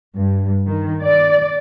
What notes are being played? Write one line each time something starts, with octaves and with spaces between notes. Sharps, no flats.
G2
D#3
D5